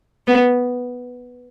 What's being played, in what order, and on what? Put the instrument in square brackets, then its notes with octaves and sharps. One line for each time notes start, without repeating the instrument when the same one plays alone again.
[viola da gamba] B3